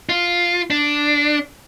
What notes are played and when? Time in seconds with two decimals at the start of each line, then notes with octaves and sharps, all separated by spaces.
0.09 F4
0.70 D4